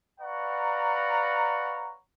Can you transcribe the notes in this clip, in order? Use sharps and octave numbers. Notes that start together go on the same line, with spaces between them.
B4 C#5 D5 F5 F#5 A#5